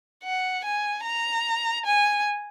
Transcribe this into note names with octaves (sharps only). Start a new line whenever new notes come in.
F#5
G#5
A#5
G#5